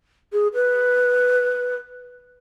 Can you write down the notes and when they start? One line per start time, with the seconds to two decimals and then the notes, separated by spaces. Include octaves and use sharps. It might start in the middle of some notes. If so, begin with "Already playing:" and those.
0.33 G#4
0.54 B4